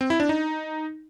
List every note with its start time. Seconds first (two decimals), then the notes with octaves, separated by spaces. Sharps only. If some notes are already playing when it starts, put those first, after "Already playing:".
0.01 C4
0.10 E4
0.20 D4
0.29 D#4